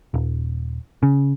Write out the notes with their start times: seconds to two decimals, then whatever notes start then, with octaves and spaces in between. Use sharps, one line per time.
0.14 D#1
1.03 C#3